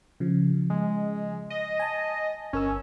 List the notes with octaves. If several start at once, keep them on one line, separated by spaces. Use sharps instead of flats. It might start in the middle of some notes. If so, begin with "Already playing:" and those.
C#3 F3
G#3
D#5
G#5 A5
G1 C#4 A#4 E6